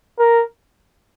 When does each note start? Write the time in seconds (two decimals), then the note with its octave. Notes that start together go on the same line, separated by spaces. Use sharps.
0.19 A#4